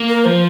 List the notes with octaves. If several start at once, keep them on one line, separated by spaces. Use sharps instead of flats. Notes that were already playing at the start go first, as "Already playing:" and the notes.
Already playing: A#3
A#4
F3 C5